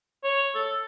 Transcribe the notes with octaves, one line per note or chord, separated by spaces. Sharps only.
C#5
A4